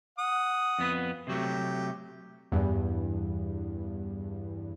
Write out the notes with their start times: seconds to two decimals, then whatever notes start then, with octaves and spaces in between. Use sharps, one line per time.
0.18 F#5 D#6
0.79 F2 B3 B4
1.27 C3 F#3 A3 G4
2.52 E2 G2